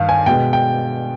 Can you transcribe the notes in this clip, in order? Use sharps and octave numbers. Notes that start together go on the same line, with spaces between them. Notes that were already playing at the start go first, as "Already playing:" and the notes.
Already playing: G2 D#3 F5
G#5
B2 G#3 G5
G5